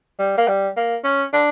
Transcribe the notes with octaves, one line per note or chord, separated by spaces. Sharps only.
G3
A#3
G3
A#3
C#4
D4